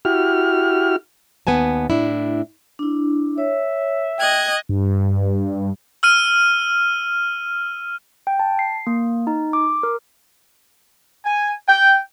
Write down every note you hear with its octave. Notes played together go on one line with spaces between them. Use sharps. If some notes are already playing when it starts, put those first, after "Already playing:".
E4 F#4 G4 F6
D#2 B3 B4 G#5 A5
A2 D4 E4
D4 E4
C#5 E5
D#5 G5 F#6 G#6
G2
E6 F6 D#7
G5
A5
C7
A#3
D#4
D6
A#4
G#5
G5